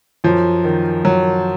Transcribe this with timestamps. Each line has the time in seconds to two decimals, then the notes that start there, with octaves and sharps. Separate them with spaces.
0.24 F#2 F3
0.64 D#3
1.04 F#2 F#3